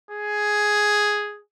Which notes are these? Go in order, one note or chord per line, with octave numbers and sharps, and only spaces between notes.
G#4